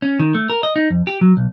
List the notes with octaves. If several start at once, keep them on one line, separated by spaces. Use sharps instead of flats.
C#4
D#3
A3
A#4
D#5
D#4
F2
G4
F#3
B1